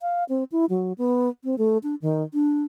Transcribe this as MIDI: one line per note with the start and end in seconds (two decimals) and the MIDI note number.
0.01 0.24 77
0.29 0.44 60
0.52 0.65 64
0.70 0.93 54
0.98 1.29 59
1.44 1.57 60
1.58 1.78 57
1.83 1.95 62
2.02 2.23 51
2.34 2.64 62